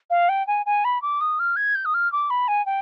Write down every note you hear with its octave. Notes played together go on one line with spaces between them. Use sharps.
F5
G5
G#5
G#5
B5
D6
D#6
F6
G#6
G6
D#6
F6
D6
B5
G#5
G5